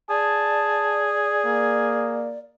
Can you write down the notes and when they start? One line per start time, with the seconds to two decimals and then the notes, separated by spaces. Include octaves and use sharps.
0.10 G#4 D5 A5
1.45 A#3